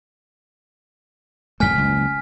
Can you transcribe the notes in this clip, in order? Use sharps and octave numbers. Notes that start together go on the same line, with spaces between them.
C2 F#2 A3 G#5 F6 B6
F#1 C#2